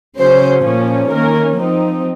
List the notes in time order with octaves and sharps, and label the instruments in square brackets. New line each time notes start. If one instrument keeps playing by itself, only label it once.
[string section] C#3 F#3 C#4 C5
A#2 F3 A#3 C#4
D#3 A#3 C#4 A#4
F3 C4 D#4